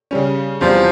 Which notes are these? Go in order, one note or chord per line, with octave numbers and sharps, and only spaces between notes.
C#3 G3 C#4
E2 C3 E3 F3 G3